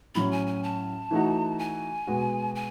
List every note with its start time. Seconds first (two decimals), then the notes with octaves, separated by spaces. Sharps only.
0.15 A2 F#3 C#4 B5
0.32 G#5
0.47 G#5
0.63 A5
1.11 E3 A3 D#4 F#4
1.59 G#5
2.07 B2 G#3 B3 F#4
2.55 G#5